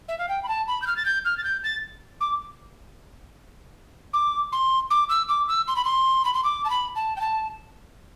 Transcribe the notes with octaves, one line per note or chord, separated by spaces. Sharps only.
E5
F5
G5
B5
A5
B5
G6
F6
A6
G6
F6
A6
G6
A6
D6
D6
C6
D6
E6
D6
E6
C6
B5
C6
B5
C6
D6
A5
B5
A5
G5
A5